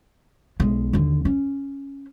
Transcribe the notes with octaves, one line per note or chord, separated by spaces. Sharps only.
B1 G#3
D#2 D3
C#4